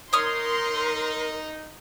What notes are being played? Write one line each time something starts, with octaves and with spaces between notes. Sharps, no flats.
D#4 A#4 C#5 C6 D#6 F6